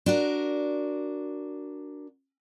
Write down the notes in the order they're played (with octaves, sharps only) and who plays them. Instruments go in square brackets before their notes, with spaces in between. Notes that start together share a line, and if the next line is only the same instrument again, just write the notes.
[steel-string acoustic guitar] D4 F#4 A#4